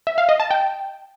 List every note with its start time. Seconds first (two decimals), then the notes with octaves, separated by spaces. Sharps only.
0.07 E5
0.18 F5
0.29 D#5
0.40 A5
0.51 G5